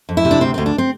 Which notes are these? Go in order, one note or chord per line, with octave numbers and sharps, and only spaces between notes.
F2
E4
C3
D4
D2 C4
D2 C4
D4
C4